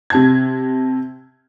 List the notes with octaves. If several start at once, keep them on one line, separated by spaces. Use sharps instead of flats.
C3 A5 G#6